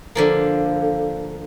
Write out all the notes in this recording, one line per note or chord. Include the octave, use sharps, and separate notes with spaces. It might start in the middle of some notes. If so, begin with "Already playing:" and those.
D3 F3 A#3